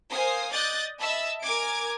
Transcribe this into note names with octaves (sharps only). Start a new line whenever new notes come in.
A#4 C5 F5 G#5 D#6
D5 D#5 D#6 F#6 G6 A6
D#5 E5 A5 B5 E6
A#4 G#5 D6 G#6 D7